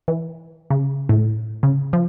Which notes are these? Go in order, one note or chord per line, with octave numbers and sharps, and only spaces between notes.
E3
C#3
A2
C#3
F3